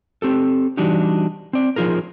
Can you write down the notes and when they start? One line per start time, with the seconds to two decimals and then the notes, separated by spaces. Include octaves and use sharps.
0.22 C4 G4 A4
0.77 E3 G3 D4 D#4 F#4 G4
1.53 C4 D5
1.76 F3 D#4 F4 G#4 A#4